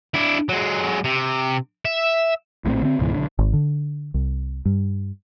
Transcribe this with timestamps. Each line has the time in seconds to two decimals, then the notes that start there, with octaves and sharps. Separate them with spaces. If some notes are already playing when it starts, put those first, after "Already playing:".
0.14 D4 E4
0.49 F#3 G#3
1.04 C3
1.85 E5
2.65 A#1 A2 F3 C4
2.82 D3 C4
2.99 C#2 G#2 B2 E3
3.13 B1 D3
3.39 G#1
3.53 D3
4.14 C2
4.65 G2